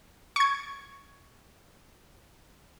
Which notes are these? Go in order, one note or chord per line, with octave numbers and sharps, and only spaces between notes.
C#6 G#6